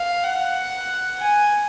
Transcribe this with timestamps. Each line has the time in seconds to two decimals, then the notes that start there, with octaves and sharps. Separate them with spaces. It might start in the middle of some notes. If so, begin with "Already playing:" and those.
Already playing: F5
0.24 F#5
1.19 G#5